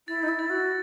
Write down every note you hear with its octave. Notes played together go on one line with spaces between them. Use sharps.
E4 A6
D#4
E4
A6
F#4